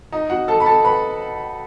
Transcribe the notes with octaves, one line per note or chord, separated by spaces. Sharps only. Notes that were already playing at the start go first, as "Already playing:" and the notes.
D#4 D#5
F#4 F#5
A4 A5
B5
A4 A5
B4 B5